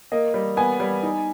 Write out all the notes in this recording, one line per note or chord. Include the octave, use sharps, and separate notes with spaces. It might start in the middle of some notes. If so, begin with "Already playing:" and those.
A#3 D#5
G3
B3 G#5
G3
D#4